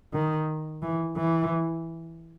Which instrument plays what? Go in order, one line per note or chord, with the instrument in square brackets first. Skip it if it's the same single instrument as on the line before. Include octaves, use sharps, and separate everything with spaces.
[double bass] D#3
E3
E3